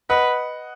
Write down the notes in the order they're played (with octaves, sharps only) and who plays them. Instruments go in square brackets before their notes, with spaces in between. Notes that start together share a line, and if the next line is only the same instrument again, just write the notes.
[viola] B4 [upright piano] D#5 F#5